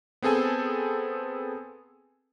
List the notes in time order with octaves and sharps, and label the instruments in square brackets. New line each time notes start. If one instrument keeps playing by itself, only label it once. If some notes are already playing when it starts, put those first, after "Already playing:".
[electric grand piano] B3 C4 G#4 A4 G#5